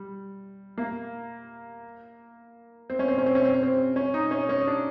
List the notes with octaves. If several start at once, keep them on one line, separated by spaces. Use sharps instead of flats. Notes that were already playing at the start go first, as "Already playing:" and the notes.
Already playing: G3
A#3
C4
C#4
C4
C#4
C4
C#4
C4
C#4
C4
C#4
D#4
C#4
C#4
D4